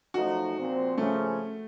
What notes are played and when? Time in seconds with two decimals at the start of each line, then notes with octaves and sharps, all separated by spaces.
0.13 F#2 F3 A3 D#4 F#4
0.56 A#2 F3 C4
0.98 C#3 F3 A3 A#3 C#4